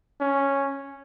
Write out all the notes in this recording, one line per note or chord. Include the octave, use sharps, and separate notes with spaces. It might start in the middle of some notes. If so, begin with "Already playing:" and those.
C#4